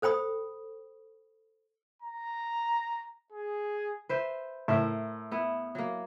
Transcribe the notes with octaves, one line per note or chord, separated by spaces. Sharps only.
A4 C5 G5 B5 D#6
A#5
G#4
B4 C5 E5
A2 A#4 E5
B3 E4
F#3 A#3